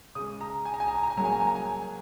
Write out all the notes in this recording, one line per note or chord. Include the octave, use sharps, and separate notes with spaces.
C#3 G#3 D#6
A#5
G#5
A#5
G#5
A#5
G#5
A#5
G#5
C#3 F#3 A#3 A#5
G#5
A#5
G#5
A#5
G#5
G#5